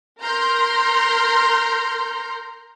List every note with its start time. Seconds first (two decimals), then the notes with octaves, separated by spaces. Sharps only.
0.22 A#4 A#5 C6 F6 G6